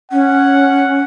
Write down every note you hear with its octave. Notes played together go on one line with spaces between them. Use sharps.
C#4 F#5